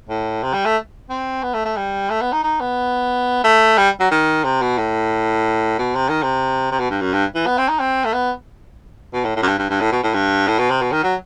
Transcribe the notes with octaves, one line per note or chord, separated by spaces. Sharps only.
A2
C3
G3
A3
C4
B3
A3
A3
G3
A3
B3
D#4
D#4
B3
A3
G3
F#3
D#3
C3
B2
A2
B2
C3
D#3
C3
C3
B2
G2
F#2
G2
E3
B3
C4
D#4
C4
A3
B3
B2
A2
A2
F#2
G2
G2
G2
A2
B2
A2
G2
A2
B2
C3
B2
D#3
F#3